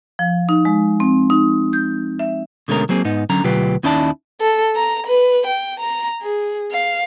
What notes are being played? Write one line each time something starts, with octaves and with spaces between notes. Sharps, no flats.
F3
D#4
G#3
C4
D#4
G6
E5
B2 D3 G#3 A3 C#4 A#4
F#3 A#3 C4 G#4
G#2 B3 D#4
D3 F#3 C#4 A#5
D2 B2 F#3 F4 G4 B4
D#2 C#4 D#4 E4 D5 A5
A4
A#5
B4
G5
A#5
G#4
F5